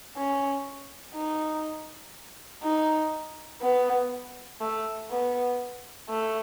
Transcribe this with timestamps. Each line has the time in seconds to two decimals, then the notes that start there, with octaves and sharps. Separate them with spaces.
0.17 C#4
1.15 D#4
2.63 D#4
3.62 B3
4.61 A3
5.10 B3
6.09 A3